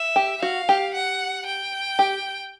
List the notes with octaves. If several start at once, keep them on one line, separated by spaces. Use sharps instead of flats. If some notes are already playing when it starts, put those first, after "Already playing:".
Already playing: E5
G4
F#4 F5
G4
F#5
G5
G4